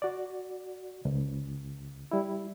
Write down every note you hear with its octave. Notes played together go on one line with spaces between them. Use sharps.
F#4 D5
C#2
G3 E4